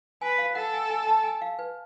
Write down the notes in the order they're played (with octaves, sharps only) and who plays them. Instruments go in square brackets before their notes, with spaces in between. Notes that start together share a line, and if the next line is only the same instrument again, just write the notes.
[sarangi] B4 [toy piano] G#5
[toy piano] F5
[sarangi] A4 [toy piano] F#5
[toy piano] G#5
G#5
A5
G#5
F5
B4